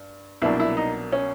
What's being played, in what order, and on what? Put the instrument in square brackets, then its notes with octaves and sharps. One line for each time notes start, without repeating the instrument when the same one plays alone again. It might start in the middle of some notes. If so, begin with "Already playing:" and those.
Already playing: [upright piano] G2
[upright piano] C2 B2 F#3 A#3 D4 [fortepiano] E4
[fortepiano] E4
D#4
C#4